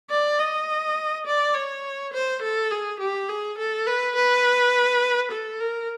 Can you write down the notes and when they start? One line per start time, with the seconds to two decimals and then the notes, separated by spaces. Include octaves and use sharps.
0.10 D5
0.39 D#5
1.26 D5
1.55 C#5
2.13 C5
2.42 A4
2.71 G#4
2.99 G4
3.29 G#4
3.58 A4
3.87 B4
4.16 B4
5.31 A4
5.60 A#4